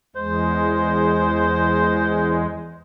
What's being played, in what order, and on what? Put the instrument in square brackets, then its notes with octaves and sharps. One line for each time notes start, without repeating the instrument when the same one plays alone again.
[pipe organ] E2 G#3 [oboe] C5